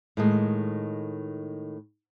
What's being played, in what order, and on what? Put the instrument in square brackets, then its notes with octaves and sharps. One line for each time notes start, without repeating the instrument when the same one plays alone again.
[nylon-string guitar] A2 D#3 G#3